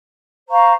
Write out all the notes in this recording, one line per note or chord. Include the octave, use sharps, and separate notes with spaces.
C5 F5 A#5 C#6